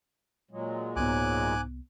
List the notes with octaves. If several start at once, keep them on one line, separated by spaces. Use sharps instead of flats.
A#2 F#3 G#3
C2 G#2 B3 G#5 D6 F#6